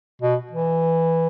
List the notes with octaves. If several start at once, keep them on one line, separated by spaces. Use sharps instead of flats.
B2
E3